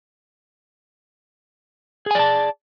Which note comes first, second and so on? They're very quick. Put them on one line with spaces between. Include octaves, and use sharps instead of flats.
G#4 G#5 D5 A5